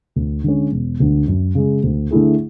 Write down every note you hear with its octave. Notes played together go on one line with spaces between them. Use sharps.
D2
D3 G#3 C#4
E1
D2 D3
F#2
C#3 G#3
D2
D3 A3 E4 G#4